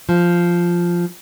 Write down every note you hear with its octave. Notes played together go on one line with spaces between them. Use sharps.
F3